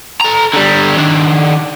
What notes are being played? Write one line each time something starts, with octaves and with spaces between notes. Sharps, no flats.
A4 A#5
D3 G3
D#3 D4